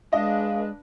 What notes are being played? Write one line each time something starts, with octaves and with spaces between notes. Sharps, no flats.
G#3 D4 B4 D#5 F5